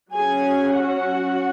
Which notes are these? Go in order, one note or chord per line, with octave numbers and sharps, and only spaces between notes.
F#3 C#4 G#4 G#5
F#4 F#5